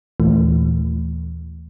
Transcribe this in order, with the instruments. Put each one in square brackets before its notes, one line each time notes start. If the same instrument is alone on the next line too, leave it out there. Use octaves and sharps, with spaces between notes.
[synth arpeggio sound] D#2 A#2 E3 A3